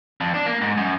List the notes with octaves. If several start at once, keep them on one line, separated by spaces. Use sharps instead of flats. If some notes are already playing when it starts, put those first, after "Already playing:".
F2
D4
A#3
G#2
F#2